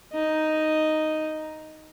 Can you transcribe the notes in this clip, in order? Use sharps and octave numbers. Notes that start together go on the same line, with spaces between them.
D#4 D#5